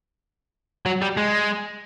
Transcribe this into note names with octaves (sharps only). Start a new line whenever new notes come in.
F#3
G3
G#3